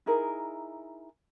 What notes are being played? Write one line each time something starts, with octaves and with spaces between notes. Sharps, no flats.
D#4 E4 G#4 A#4